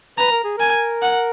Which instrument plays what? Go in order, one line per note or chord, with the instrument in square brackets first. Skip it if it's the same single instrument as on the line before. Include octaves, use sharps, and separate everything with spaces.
[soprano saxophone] B4 [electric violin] A#5
[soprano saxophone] A#4
G#4
[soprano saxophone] A#4 [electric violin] G#5
[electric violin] F#5